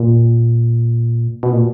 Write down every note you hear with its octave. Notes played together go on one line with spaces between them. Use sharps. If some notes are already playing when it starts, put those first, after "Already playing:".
Already playing: A#2
B2
A#2